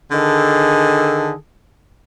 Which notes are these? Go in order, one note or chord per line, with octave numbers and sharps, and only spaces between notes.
D3 D#3 G#4 A4